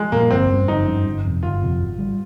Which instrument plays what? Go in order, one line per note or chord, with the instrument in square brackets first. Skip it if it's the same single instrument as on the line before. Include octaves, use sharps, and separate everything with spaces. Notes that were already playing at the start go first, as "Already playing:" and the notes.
Already playing: [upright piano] G#3
[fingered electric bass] A#2 G3 [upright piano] A#3
[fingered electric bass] G1 [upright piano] C4
[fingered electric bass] G2 G3 C#4
[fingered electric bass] G1 [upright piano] D#4
[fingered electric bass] G2 G3 C#4
G1
F2 C3
[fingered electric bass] G1 [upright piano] F4
[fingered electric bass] F2 C3
G#1
G3